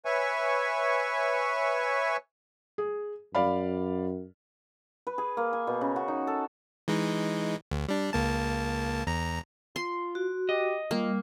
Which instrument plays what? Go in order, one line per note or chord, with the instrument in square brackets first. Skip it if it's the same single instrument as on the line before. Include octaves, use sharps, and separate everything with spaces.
[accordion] B4 C#5 E5 G#5 C#6
[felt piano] G#4
[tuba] F#2 [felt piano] D5 F5 B5
[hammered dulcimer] B4
G#4
A#3
G#5
B2
C#3
F#4
D#4
A4
[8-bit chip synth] E3 G#3 D#4
D2
G3 D4
C#2 A#3 A5
E2 A#5
[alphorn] F4 [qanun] C6
[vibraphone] F#4
[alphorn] G4 [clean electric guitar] D#5
[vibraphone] G3 [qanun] A#3 [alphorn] F4